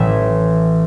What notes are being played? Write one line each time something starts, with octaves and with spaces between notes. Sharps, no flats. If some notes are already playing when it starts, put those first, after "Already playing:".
Already playing: A1 A2 E3 E5